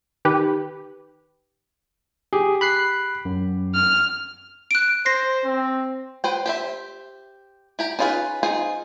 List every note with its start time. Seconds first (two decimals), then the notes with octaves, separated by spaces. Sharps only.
0.25 D#3 G4 B4
2.33 G4 G#4
2.61 B5 F#6 C7
3.25 F#2
3.75 F6
4.71 F#6 D7
5.06 C5 A#6 C7
5.45 C4
6.24 B4 C5 G5
6.46 G4 C5 E5
7.79 E4 G4 A#5
7.99 C#4 D#4 F4 G#4 B4
8.43 D#4 F4 G#4 C5